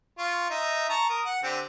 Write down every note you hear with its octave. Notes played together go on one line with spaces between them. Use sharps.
F4 C#6
D#4 E5
A5 A#5 C#6
A#4 D#6
F#5
D3 C4 G4